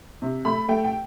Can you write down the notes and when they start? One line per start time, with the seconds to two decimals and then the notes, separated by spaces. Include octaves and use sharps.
0.22 C3
0.45 A3 B5
0.68 A3 G5
0.84 G5